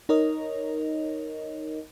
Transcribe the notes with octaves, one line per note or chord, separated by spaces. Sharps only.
D#4 A#4 C#5 D#5